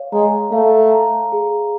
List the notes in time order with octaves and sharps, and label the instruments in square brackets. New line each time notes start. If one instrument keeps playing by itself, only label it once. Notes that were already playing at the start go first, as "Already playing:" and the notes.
Already playing: [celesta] C#5 F5
[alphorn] G#3 [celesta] A#5
[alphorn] A3 [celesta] F5
[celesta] A#5
G#4